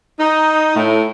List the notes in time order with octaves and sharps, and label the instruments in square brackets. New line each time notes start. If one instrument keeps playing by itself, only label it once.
[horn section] D#4
A2